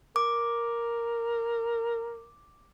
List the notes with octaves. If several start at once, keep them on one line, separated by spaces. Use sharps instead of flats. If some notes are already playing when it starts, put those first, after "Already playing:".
A#4 D6